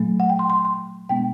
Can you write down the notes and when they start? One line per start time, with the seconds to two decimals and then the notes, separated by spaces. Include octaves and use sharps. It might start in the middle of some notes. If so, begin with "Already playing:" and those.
Already playing: A#2 F#3 A3
0.20 F#5
0.30 G5
0.39 C6
0.50 C6
0.65 C6
1.09 B2 G#3 B3 D4 G5